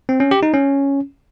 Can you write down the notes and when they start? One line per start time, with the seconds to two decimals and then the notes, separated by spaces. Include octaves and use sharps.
0.09 C4
0.20 C#4
0.31 G4
0.43 D#4
0.54 C#4